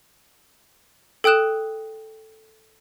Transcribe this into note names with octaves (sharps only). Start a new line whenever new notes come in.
A4 G5 D#6 F#6 E7